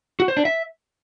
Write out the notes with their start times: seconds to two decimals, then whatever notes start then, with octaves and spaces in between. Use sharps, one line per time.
0.20 F#4
0.28 C5
0.37 D4
0.45 E5